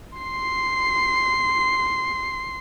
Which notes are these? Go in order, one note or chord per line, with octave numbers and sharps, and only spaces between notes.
C6 C7